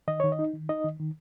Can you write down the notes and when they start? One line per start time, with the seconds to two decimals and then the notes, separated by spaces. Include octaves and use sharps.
0.08 D#3 D#5
0.20 D#3 C#5
0.32 D#5
0.39 D#4
0.53 D#3
0.69 D#4 D#5
0.84 D#3
0.99 D#3